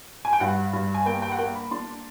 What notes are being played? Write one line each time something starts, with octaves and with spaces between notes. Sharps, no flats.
G#5
G5
G2 F#5
G2
G#5
A#3 G5
G5
F#5
A#3 G5
B5
D4 C6